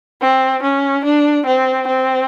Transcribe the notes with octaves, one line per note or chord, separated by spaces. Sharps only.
C4
C#4
D4
C4
C4